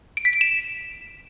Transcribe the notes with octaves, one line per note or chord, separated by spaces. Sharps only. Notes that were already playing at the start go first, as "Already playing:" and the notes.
D7
B6
D7
E7